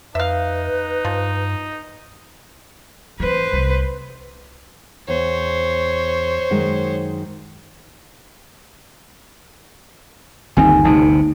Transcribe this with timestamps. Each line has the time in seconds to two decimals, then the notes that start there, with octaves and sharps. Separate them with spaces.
0.15 F2 D#4 B4 E5 F5
1.05 G2 F3
3.20 E3 C4 B4 C5
3.53 C2
5.08 E2 C5 C#5
6.50 F#2 D#3 G#3
10.57 G1 D#2 C4 D#4 G#5
10.84 G1 D2 C3 D#4 A5